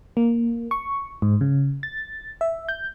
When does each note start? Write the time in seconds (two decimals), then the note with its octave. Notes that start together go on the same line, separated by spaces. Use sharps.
0.17 A#3
0.71 C#6
1.22 G#2
1.41 C#3
1.83 A6
2.41 E5
2.69 G6